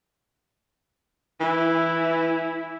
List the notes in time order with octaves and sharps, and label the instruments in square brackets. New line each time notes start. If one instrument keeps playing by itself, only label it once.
[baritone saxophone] E3 [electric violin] E4